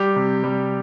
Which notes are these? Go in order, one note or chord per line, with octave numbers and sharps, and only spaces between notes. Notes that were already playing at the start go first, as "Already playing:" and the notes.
Already playing: G3 G4
C3
G3